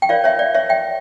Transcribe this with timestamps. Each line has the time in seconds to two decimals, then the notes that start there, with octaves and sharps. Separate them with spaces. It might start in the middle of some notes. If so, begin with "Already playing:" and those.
0.02 G5
0.09 F4 A#4 C#5 D5 F5
0.24 C#5 E5
0.39 D5
0.55 C#5 E5
0.69 E5 G5